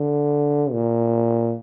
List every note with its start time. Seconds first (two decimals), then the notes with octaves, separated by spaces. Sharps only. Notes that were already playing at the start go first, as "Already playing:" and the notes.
Already playing: D3
0.72 A#2